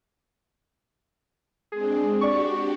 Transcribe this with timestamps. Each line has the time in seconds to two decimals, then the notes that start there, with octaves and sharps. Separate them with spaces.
1.72 G#3 C4 D4 G#4
2.21 D4 F#4 G4 D5 C#6